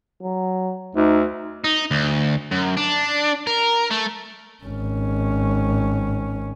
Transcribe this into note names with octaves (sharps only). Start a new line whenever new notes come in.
F#3
D2 D#4
D#4
D2
F#2
D4
A#4
A3
G#1 C#4